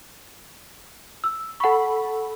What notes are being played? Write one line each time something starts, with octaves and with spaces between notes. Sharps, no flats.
E6
A4 F#5 B5 C#6